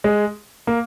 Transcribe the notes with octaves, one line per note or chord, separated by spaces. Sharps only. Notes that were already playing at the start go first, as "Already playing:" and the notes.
G#3
A#3